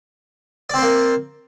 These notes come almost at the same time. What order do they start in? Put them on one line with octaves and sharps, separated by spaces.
D5 C4 C5 A#3